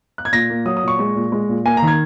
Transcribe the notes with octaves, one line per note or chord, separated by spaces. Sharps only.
F#6
G#6
A#2 A#6
A#3
F#3 D#6
D#6
A#2
C#6
G#3
A#2
G#3
A#2
A#3 G#5
A#5
D#3
G#6